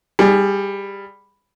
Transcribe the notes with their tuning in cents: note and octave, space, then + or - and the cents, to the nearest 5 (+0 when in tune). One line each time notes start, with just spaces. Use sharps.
G3 +15 G#4 +0